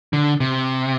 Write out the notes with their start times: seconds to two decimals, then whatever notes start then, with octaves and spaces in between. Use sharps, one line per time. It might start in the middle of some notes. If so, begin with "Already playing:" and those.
0.13 D3
0.40 C3